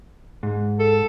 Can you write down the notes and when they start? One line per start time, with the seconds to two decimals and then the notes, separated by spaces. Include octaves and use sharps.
0.43 G#2
0.79 A4